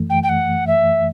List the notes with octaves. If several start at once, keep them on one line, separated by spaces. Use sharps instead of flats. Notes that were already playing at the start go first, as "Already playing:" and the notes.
Already playing: F#2 E3 A3
G5
G5
F#5
E5